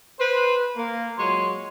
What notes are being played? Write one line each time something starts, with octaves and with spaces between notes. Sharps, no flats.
B4 C5
A#3
A#2 F#3 G#3 C#5 C6